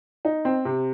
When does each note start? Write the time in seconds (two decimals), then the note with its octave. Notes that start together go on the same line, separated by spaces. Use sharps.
0.25 D#4
0.45 C4
0.65 C3